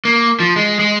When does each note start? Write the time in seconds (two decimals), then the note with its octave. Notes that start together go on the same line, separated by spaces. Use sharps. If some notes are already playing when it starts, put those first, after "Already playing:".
0.05 A#3
0.40 F3
0.56 G#3
0.79 G#3